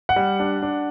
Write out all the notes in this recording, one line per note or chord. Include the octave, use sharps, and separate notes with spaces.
F#5
G3
D4
D4